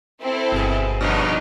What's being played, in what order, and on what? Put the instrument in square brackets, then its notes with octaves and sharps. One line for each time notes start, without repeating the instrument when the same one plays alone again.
[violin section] C4 E4 A4
[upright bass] G1 [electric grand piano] B2 G#4
[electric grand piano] A#1 G2 B2 [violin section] D4 D#4 C#5